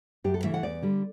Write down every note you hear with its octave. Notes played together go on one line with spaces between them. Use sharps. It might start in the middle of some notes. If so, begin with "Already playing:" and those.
F#2 G4
A4
C#3 E3 A3 E5
F#5
E2 D5
D3 G3